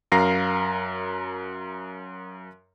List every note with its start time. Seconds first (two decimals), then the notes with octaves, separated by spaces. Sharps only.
0.12 F#2 A#4 F5 A#5 A#6 C7